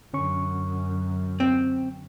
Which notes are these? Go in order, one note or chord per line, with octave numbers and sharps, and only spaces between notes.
F#2 D3 C#4 C#6
C4